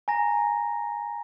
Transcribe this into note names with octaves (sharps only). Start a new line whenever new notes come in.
G#5 A#5 A#6